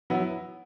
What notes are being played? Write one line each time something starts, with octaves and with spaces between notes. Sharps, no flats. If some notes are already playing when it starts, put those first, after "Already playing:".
F#3 B3 E4